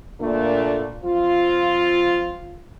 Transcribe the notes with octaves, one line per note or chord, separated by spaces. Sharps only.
A#2 D3 A3 A#3 D4
F3 C4 F4